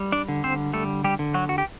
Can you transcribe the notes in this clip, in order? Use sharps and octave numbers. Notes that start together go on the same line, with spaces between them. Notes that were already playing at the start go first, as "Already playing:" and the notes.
Already playing: G3
D4 D5
D3
C4 C5
G3 A3 A4
G3 G4
D3
F#3 F#4
F#4
G4